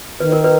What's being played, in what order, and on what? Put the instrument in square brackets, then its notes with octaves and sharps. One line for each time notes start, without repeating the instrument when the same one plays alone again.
[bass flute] D#3 [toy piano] B4
[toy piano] A#4
B4